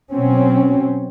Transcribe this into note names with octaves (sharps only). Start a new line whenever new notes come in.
B2 F#3 C4 C#4